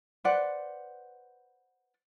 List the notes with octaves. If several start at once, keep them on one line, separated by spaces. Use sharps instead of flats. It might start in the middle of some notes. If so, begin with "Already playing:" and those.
B4 C5 D5 F#5